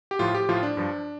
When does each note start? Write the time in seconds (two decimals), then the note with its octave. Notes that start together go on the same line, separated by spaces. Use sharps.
0.11 G4
0.19 A2 F3 F4
0.35 G4
0.48 A2 F3 F4
0.63 D4
0.77 G2 F3